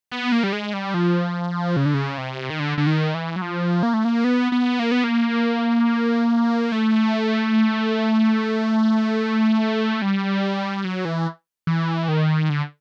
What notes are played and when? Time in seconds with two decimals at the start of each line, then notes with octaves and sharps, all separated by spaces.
0.12 B3
0.32 A#3
0.44 G3
0.53 G#3
0.73 G3
0.94 F3
1.77 C#3
1.86 D3
1.94 C#3
2.18 C3
2.50 D#3
2.60 D3
2.78 D3
2.87 D#3
3.15 E3
3.36 F#3
3.42 F3
3.83 A#3
3.94 A3
4.05 A#3
4.24 B3
4.52 B3
4.79 A#3
4.92 B3
5.04 A#3
6.72 A3
10.02 G3
10.85 F#3
11.05 E3
11.67 E3
12.08 D#3
12.50 D3